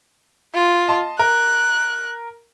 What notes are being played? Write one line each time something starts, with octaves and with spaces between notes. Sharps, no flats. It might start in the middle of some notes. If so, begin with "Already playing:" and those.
F4
D#5 A5 C6
A#4 F#6